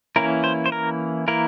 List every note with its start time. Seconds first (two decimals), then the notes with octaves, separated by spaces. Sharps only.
0.16 E3 A#3 C#4 E4 A#4
0.44 C5
0.66 C5
0.72 A#4
1.28 E3 A#3 E4 A#4